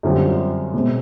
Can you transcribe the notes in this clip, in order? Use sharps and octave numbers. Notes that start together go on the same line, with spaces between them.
F#2 D3 G3 C4 F4
B2 G#3 C4